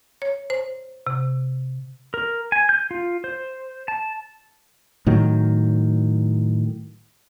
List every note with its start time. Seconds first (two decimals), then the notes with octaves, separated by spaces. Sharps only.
0.22 C#5
0.50 C5
1.07 C3
2.14 A#4
2.52 G#5
2.69 G6
2.91 F4
3.24 C5
3.88 A5
5.06 A2 D#3 F#3